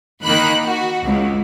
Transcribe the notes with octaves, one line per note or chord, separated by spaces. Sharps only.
D#3 A#3 B5 F#6
F#4
C#2